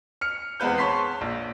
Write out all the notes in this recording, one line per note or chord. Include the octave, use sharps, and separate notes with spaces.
F6 C#7
E2 G#3 B3 C4 B4 G6
C#5 A5 C6 C#6 B6 C7
A#1